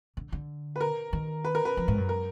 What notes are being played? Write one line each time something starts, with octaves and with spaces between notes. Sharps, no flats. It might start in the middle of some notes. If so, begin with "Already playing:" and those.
D3
D3
B4
A#4
D#3
B4
A#4
B4
F3
G#2
F#2
A#4